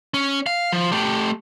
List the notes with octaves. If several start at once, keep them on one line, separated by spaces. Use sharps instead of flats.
C#4
F5
F3
A3 G4